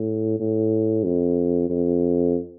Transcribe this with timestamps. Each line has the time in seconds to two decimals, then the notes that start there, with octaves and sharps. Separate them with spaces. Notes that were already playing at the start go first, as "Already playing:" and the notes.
Already playing: A2
0.40 A2
1.05 F2
1.70 F2